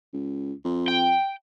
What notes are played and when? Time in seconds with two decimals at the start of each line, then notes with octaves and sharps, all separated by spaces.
0.13 C#2
0.65 F2
0.88 G5